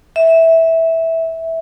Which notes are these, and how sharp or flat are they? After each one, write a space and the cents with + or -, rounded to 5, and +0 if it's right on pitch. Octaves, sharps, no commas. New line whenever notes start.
E5 -10